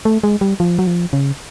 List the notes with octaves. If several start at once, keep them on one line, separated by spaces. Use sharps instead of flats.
A3
G#3
G3
F3
F#3
F3
C#3